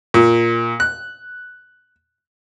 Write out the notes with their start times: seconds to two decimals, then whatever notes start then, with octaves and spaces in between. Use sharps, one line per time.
0.14 A#2
0.80 F#6